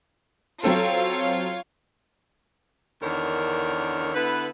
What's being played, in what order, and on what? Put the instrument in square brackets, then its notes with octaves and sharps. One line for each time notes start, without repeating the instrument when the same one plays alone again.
[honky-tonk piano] F#3 C4 A4 [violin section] F4 C#5 F5
[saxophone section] E2 D3 D#3 D4 A#4 C#5
D3 B3 E4 B4